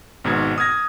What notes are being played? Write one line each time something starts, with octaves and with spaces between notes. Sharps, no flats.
G#1 G#2 B2 G#6
D#6 F6 G#6 A#6